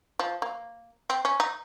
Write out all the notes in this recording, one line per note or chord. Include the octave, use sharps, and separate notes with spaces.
F3
A#3
C4
C#4
D#4